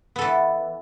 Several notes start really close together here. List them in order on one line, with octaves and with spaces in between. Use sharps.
B3 A4 E3